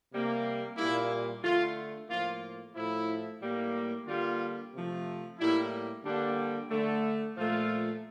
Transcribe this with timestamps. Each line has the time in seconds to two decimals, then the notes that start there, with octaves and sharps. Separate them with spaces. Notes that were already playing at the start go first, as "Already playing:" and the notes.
0.11 C3 G3 A#3
0.76 A#2 G3 A#3 E4
1.43 D3 A3 F4
2.09 A2 F3 A#3 F4
2.74 A2 F3 A3 E4
3.41 A2 G3 A#3
4.06 D3 G3 A#3 F4
4.73 C3 F3 A3
5.39 A2 G3 A#3 E4
6.04 D3 G3 A#3 D4
6.70 D3 A3
7.36 A#2 F3 A3 F4